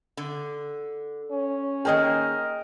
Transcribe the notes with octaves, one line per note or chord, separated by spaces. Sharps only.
D3
C#4
D#3 A#3 G#4 A#4 D#5 G5